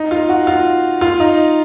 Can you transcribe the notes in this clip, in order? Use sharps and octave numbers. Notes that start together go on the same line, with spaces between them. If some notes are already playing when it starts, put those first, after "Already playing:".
Already playing: D#4
F4
F#4
F4
F4
D#4